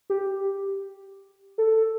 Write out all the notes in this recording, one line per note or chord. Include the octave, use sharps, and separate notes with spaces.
G4
A4